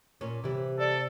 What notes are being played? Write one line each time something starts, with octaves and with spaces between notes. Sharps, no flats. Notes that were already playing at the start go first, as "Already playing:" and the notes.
A#2 C#4
C3 E3 G3
A4 D5